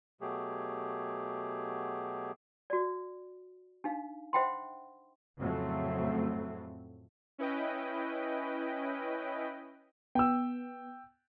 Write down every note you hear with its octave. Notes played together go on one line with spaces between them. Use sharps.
B2 F#3 A3 G4 G#4
F#4 D5
D4 D#4 F5
C5 E5 F#5 G5 B5 C6
F2 A2 C#3 F#3 A3 C4
C#4 E4 B4 D#5 G5
B3 G5 E6